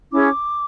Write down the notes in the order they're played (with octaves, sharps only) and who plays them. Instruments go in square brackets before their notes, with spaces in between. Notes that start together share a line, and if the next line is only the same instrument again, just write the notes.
[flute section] C#4 E4 G#4 C#5 [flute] D6